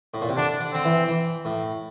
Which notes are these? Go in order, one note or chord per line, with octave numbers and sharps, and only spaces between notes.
A2
A#2
C3
D3 D4
D3
D3 C4
E3
E3
A2